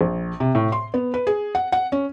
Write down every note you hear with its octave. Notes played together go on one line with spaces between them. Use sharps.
A#1
C3
A2
C6
B3
B4
G#4
F#5
F#5
C#4